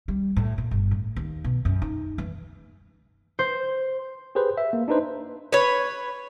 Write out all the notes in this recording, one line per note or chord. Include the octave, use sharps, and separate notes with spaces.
G3
A2
A#2
G1
A2
D#2
B2
F#2
D#4
E3
C5
G4 G#4 B4 C5
E5
A#3
D4 D#4 B4 C5
B4 C#5